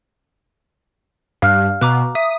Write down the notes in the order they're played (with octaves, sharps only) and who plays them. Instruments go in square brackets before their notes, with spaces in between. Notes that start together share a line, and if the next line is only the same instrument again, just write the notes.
[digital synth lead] G2 [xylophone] F5 F6 F#6
[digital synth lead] B2 [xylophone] A#5 D6 F#6
[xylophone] E5 [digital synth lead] D#6